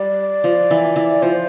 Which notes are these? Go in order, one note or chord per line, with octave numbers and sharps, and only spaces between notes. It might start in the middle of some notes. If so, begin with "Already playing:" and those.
Already playing: G3 D5
F3
E3
E3
F3 C5